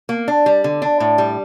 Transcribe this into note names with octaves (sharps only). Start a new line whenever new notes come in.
A#3
D4
G3
D3
D4
A2
G3